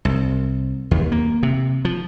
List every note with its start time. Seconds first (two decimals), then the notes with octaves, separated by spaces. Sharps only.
0.05 C2
0.91 D#2
1.12 A#3
1.43 C3
1.85 F3